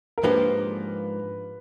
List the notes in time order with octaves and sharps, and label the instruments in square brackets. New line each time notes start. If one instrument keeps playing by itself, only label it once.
[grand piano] A#4
[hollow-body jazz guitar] G#2 F3 A#3 D4 G4 [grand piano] B4